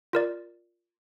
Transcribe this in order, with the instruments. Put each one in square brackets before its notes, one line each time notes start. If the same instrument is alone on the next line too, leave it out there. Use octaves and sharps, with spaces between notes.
[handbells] F4 A#4 D5